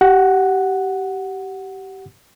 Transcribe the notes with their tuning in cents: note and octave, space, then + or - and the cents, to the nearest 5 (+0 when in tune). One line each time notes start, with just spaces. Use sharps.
G4 -20 F#5 +0